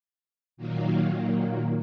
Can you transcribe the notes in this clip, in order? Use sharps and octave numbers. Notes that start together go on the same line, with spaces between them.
A#2 D#3 F#3 A#3